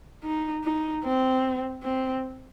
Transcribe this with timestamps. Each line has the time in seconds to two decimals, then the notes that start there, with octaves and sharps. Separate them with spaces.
0.24 D#4
0.64 D#4
1.04 C4
1.83 C4